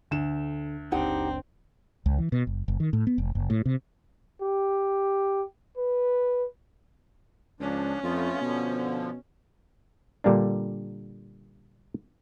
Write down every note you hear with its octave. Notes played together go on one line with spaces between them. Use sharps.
D2 D3 E7
F#1 C#2 C4 D4 D#4 G4 F#5
C#2
E3
B2
F#1
F#1
D#3
A2
B3
F1
F#1
A2
C3
G4
B4
C#2 F3 C#4 D4
F2 A3 B3 F4
B2 D3 F3
A#2 D3 G3 A#3 D4